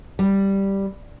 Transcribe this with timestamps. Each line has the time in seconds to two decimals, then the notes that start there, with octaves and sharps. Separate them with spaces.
0.19 G3